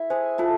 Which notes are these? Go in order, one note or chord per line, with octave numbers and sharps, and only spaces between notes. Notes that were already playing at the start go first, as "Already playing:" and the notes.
Already playing: E4 E5
G#4 C5 G#5
F4 A4 A5